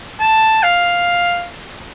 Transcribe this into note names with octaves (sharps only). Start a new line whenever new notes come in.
A5
F5